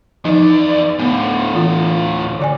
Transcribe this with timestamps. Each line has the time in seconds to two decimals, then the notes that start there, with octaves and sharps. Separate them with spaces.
0.25 E2 F3 D#4 D5
0.99 A2 D3 B3
1.53 E3 F4
2.39 D3 D5 G#5